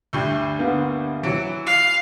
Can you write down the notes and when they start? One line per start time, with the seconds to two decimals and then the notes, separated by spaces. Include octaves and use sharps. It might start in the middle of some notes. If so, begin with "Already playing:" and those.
0.13 D2 G2
0.59 D3 A#3 B3
1.23 E3 F#3 C#7 D7
1.67 F5